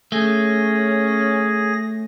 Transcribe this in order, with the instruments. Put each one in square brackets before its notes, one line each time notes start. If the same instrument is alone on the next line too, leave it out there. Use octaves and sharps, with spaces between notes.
[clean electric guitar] A3 [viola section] C#4 [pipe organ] G#4 A#6